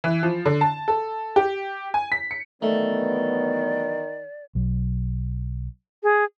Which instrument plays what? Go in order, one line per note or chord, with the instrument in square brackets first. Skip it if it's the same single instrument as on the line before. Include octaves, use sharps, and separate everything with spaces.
[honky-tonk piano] E3
F3
D3
A5
A4
G4
G#5
B6
C#7
[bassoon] D#3 [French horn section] E3 F#3 B3 [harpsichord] A3 [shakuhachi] D5
[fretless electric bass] B1 F#3
[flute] G#4